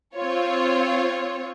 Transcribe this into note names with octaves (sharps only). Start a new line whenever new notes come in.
C4 F4 C#5